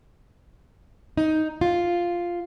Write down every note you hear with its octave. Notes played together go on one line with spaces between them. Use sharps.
D#4
F4